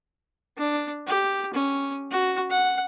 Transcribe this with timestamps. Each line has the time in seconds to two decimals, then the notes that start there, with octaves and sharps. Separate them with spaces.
0.58 D4
1.07 G4
1.54 C#4
2.11 F#4
2.50 F#5